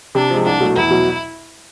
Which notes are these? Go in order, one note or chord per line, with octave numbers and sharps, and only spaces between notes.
C3 D4
F3 G#3
C2 D4
B2 F#3 A3
E2 E4
B2 F#3